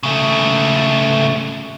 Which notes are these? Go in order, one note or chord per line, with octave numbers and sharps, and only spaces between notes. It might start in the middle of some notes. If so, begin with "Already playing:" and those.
C#3 A3